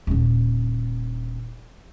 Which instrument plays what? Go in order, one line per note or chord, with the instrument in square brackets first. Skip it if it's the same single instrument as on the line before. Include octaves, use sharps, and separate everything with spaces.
[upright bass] D#1 D3